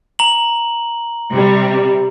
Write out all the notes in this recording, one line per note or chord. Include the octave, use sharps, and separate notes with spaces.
A#5 F#7
C3 G3